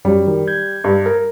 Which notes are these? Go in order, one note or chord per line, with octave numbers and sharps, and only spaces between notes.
F#2 F#3 G3
D#3
G6 G#6
G2
A#4